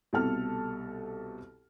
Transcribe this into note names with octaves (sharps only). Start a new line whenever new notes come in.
C2 B2 G4 A4 A5 F6